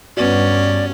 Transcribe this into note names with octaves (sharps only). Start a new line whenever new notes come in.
G2 B3 C#4 F#4 D5